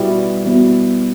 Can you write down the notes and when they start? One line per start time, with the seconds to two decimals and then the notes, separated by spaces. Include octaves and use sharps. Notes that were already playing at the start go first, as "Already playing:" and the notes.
Already playing: B2 G3 B3 E4
0.44 B2 G3 B3 E4